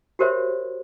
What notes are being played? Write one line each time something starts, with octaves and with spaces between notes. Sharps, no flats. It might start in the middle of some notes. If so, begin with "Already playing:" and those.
F#4 G4 A#4 C5 C#5 E5